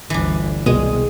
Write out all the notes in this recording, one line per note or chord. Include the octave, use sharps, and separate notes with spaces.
G1 D2 E3 D4
C2 B2 G#3